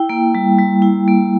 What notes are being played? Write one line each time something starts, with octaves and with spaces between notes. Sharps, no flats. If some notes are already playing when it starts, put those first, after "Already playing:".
Already playing: E4 G5
A#3
G3
G3
E4
A#3